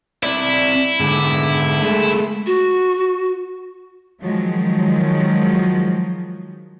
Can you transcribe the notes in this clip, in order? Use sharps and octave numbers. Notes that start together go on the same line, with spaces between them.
C4 E4 D5
G#2 D3
G#3 A3
F#4
D#3 F3 F#3 G#3